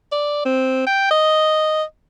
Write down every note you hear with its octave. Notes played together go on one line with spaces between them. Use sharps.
D5
C4
G5
D#5